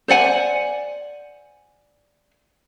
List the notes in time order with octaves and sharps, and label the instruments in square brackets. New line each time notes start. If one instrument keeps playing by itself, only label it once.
[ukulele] C5 D5 F#5 G#5